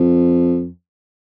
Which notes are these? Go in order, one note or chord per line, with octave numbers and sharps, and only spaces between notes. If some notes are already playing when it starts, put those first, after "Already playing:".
Already playing: F2